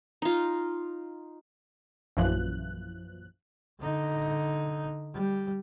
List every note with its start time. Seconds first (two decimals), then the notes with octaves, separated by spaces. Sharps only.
0.22 D#4 F4
2.17 A#1 F#2 E3 F3 F#6
3.81 D3 D#4
5.14 G3